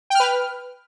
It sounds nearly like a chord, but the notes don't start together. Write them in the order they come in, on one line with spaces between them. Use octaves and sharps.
G5 F6 B4